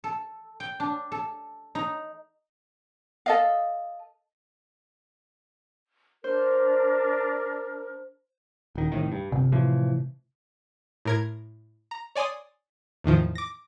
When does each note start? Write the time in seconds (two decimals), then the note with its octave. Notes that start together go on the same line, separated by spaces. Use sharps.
0.04 A4
0.60 G5
0.80 D4
1.12 A4
1.75 D#4
3.26 A4 D#5 F5
6.24 D4 A#4 C5
8.75 D#1 D#3
8.92 C2 A2 D#3
9.12 G2
9.32 G1 C3
9.52 A2 E3 F3
11.05 A2 A#4 G#6
11.91 A#5
12.15 C#5 D5 G#5 C6 D#6
13.04 E2 A2 D#3 F3
13.35 D6 A#6